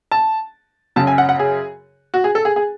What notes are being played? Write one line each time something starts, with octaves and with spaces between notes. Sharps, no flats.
A5
F#2 C#3 F#3 A5
G#5
F#5
F#5
G#4
F#4
G#4
A4
G#4
G#4